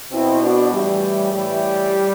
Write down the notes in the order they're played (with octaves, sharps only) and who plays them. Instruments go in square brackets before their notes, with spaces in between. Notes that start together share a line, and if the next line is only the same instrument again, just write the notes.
[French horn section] B2 C4 E4
D4 F#4
A2 E3 G3
A2 E3 G3